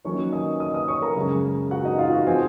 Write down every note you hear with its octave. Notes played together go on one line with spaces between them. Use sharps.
D#3 F#3 A#3 C#4 C#5 C#6
D#5 D#6
D#5 D#6
D#5 D#6
C#5 C#6
A#4 A#5
F#2 C#3 G#3 C#4
F#4 F#5
D#4 D#5
F4 F5
F#4 F#5
F3 C4 G#4 G#5